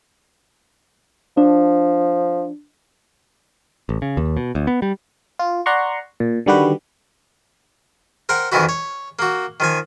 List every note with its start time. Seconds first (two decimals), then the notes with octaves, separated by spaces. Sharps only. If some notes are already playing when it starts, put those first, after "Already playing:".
1.37 F3 D4
3.89 A1
4.02 C#3
4.17 D#2
4.37 B2
4.55 D2
4.67 B3
4.82 G3
5.39 F4
5.66 D5 F#5 A#5 C6 C#6
6.20 A#2
6.46 D3 D#3 G3 F#4 G4 B4
8.29 A#4 C5 F#5 G5
8.52 F2 D#3 E3 E4 F#4
8.69 C#5
9.19 A#3 F#4
9.60 D#3 F3 G#5